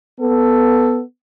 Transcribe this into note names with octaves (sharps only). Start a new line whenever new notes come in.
B3 A4